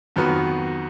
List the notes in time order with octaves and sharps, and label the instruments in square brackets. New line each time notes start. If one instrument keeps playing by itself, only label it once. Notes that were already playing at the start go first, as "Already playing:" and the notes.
[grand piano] F2 D#3 F#3 B3 F#4